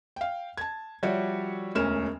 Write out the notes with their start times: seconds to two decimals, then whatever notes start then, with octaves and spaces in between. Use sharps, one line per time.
0.16 F5 G5
0.57 A5 G#6
1.03 F3 G3 F#4 C#5 D5 E5
1.75 E1 D2 C#4 A#4 F6 E7